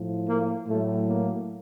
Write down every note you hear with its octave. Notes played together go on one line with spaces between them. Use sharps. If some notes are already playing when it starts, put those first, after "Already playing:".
Already playing: A2 F3
A#3
A2 F#3 A3
A#3